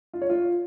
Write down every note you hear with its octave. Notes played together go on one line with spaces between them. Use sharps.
F4
C#5
F4